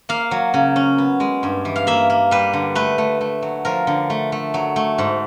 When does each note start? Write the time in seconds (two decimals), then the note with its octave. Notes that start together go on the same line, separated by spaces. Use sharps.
0.09 A#3 F5
0.31 F#3
0.54 C#3
0.76 C#4
0.98 B3
1.20 G#3
1.43 G2
1.65 E3
1.76 F5
1.87 A#3 E5
2.10 A#3
2.31 G3 B4
2.53 D3
2.75 A3 B4
2.98 A3
3.21 A3
3.42 F#3
3.65 F3 A#4
3.87 D3
4.10 A3
4.32 A3
4.54 F#3
4.76 A3
4.98 G#2